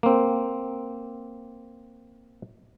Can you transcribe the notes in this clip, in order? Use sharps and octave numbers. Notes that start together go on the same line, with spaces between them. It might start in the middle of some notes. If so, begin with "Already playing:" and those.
A#3 C4